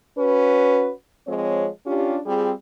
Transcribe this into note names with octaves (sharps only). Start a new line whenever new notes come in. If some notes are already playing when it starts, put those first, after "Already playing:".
C#4 F#4 B4
F3 G#3 C4 C#5
C#4 D4 F4 G4
G3 C4 F4 G#4